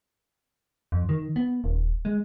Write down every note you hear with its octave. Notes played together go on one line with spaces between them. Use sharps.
F2
D#3
B3
D#1
G#3